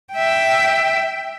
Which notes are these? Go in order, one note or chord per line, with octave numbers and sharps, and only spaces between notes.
E5 G5